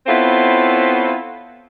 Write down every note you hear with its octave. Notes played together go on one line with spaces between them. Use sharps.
B3 C4 E4 F4 A4 C#5